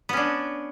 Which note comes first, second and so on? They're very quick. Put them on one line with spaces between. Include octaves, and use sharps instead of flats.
B3 C#4 D4